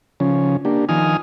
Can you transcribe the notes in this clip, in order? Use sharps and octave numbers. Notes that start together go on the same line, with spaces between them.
C#3 F3 C#4
A#3 D4 G4
D#3 F3 G#5 D#6 F6